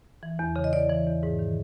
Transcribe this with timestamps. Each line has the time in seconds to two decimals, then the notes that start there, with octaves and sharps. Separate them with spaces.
0.23 E3
0.39 E2
0.56 C#3
0.64 D#5
0.73 E2 D5
0.90 E3
1.07 E2
1.23 G#2
1.39 D#3